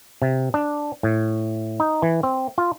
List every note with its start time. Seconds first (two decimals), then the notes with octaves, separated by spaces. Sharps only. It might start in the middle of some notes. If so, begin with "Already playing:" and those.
0.22 C3
0.54 D4
1.03 A2
1.80 D#4
2.02 E3
2.23 C4
2.58 F4